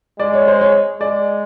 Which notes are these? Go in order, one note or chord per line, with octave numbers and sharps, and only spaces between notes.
G#3 D5
C#5
C5
C#5
G#3 D5